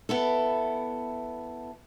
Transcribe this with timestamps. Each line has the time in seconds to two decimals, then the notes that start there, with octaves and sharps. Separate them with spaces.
0.09 B3 E4 A4